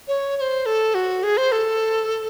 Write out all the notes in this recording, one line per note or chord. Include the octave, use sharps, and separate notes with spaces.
C#5
C#5
C5
A4
F#4
G#4
C5
A4